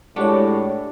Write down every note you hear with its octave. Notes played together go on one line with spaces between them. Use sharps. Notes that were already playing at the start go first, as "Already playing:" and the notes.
A2 G#3 D4 F#4 G4 C#5 F#5